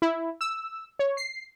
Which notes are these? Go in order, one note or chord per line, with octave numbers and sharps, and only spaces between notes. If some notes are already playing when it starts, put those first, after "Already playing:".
E4
E6
C#5
C7